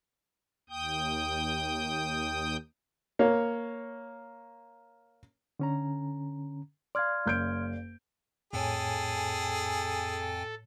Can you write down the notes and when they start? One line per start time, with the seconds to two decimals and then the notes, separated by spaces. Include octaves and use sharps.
0.70 D#2 G5 D#6 G6
3.19 A#3 C#5
5.59 D3 C#4 A#5
6.95 D5 F5 C6 F6 G#6
7.26 F#1 G6 D7
8.53 F2 A2 G#4 A4 C#5 G5 G#5